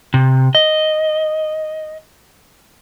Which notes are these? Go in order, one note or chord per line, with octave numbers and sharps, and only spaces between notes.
C3
D#5